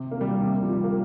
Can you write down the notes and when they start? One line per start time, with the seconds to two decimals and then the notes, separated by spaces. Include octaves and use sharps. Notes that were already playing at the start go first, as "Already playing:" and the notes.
Already playing: C3
0.11 A#3
0.21 G3
0.31 G3
0.42 C3
0.63 F3
0.73 G3
0.84 A#3